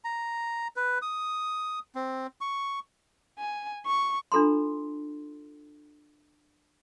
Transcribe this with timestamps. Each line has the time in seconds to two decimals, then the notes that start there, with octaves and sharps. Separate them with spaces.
0.04 A#5
0.76 B4
1.02 D#6
1.95 C4
2.41 C#6
3.39 G#5
3.86 C#6
4.32 D4 F4 A4 A#5 C6